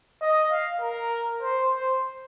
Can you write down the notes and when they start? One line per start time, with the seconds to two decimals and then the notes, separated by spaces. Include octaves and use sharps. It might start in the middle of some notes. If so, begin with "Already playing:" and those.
0.21 D#5
0.51 F5
0.81 A#4
1.42 C5
1.71 C5